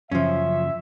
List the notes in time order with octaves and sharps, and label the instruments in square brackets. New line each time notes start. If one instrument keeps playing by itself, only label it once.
[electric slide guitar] F#2 C#3 [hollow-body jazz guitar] F3 C#4 [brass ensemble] E5